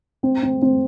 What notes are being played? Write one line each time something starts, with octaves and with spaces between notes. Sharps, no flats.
C4
C4
C4